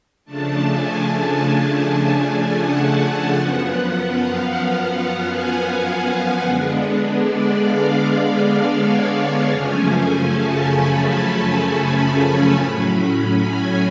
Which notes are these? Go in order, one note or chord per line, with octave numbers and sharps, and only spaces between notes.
C#3 F3 A3 D4 A5
G#5
F#5
F#2 F3 B3
F5
F#5
G#5
D3 G#3 B3 D4
D5
F5
D5
C#5
F#2 C#3 F3 A3 C#4 G#5
A5
B5
A2 F#3 C#4 B5
G#5